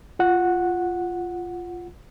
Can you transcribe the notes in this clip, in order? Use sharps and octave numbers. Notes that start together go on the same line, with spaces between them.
F4 F#5